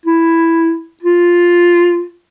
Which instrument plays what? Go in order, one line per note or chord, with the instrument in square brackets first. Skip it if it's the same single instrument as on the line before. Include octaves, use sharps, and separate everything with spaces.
[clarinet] E4
F4